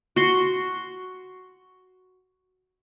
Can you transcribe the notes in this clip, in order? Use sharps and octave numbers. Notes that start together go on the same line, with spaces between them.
F#4 C6